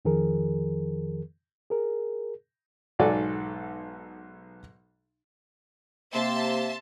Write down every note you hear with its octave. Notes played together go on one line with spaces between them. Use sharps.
F2 D#3 F3 G#4 A#4
G#4 A#4
B1 G#2 F#4 A4 D5 G#5
C3 A#3 E5 A5 C6